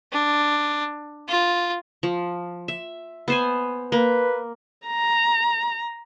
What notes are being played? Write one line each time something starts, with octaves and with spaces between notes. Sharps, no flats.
D4
F4
F3
E5
B3 C5 G#5
A#3 B4
A#5